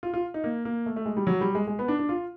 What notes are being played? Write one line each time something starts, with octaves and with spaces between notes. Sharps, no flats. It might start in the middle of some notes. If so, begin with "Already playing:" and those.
F4
F4
D#4
A#3
A#3
A3
A3
G#3
G3
F#3
G3
G#3
G#3
B3
D4
D4
F4